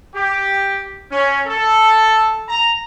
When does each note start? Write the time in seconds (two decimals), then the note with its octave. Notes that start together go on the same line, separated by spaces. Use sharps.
0.15 G4
1.12 C#4
1.47 A4
2.49 A#5